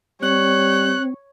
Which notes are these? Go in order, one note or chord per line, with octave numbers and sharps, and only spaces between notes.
G3 C4 C#5 F#6